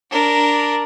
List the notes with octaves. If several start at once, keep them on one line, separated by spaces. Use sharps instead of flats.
D4 A#4